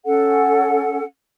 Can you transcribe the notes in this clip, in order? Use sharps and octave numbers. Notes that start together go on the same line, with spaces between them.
C#4 A4 F#5